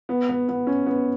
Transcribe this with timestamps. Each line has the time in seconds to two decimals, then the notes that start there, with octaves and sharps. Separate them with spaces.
0.09 B3
0.29 B3
0.48 B3
0.67 C#4
0.86 B3